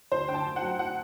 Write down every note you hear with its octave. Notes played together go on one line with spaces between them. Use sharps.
D2 C5
D3 G5
A5
D2
F#5
F#3
F#5